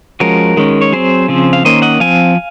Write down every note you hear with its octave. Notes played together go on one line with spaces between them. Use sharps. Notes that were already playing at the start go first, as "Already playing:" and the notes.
F3 G#3 C#4 F#4 A#4
D#3 G#3 C#4
C#5
F#3 C4 G#4 C5
C#3 F3 C4
F5
D#3 A#3 C#4 C5 D#5
D#5 F#5
F3 C4 F5 G#5